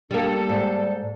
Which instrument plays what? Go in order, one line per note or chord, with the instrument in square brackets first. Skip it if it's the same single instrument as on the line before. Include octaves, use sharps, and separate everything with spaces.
[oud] G3 A#3 [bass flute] D4 [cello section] A4
[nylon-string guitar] G#2 [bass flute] D5